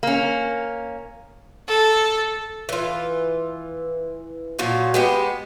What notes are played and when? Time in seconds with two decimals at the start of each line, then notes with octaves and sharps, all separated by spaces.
0.03 A#3 C#4
1.68 A4
2.69 E3 F4
4.59 A#2 F3 F#3 F#4
4.94 G#3 B3 G4